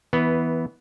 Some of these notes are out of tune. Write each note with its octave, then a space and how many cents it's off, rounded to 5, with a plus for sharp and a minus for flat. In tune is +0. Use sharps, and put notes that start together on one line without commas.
E3 -20 B3 +0